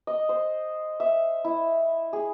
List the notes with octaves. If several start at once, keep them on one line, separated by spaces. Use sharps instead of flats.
D#5
C5
E5
E4
G#4